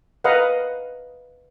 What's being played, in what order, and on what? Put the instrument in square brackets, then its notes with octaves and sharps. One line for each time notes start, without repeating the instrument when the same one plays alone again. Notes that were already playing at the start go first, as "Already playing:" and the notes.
[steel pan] A#4 B4 D#5 F5 F#5